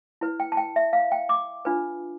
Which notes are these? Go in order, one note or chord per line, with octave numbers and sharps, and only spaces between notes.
E4 B4
G5
A5
G5
E5
F5
G5
D6
D4 F4 B4